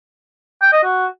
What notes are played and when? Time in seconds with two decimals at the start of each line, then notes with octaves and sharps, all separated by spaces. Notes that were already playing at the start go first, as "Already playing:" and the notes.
0.62 G5
0.73 D#5
0.84 F#4